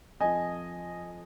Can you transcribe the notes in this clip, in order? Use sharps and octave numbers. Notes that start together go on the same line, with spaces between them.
F2 F3 D#5 G#5